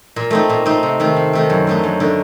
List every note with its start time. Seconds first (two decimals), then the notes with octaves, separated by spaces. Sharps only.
0.16 A#2
0.31 A3 C4 D#4
0.49 A#2
0.66 A3 C4 D#4
0.83 C3
1.00 D#3 A3 C4
1.16 C3
1.33 D#3 A3 C4
1.50 F#2
1.67 D3 A3 D#4
1.84 F#2
2.00 D3 A3 D#4